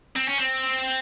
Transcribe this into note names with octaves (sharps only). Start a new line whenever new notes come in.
C4
C#4
C4